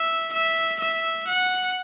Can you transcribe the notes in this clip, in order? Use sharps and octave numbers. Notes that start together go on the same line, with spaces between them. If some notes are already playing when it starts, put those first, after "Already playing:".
Already playing: E5
E5
E5
F#5